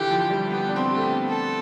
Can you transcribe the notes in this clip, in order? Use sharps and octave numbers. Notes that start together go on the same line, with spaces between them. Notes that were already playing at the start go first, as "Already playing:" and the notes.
Already playing: D3 E3 G4
F3
G3
B3 G4
D4
C4
G4
A3
B3
A4